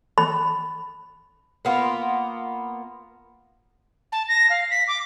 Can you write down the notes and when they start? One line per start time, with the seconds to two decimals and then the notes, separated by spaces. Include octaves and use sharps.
0.18 B5
1.65 A#3 B3 F4
4.12 A5
4.29 A#6
4.50 F5
4.71 B6
4.88 D6